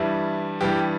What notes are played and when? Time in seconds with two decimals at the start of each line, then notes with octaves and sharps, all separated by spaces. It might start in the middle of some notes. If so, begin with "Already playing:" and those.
Already playing: G2 E3 G3 E4
0.61 G2 E3 G3 G4